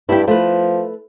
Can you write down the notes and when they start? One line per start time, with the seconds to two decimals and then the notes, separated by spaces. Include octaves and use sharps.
0.09 G2 E4 G4
0.28 F3 A3 B4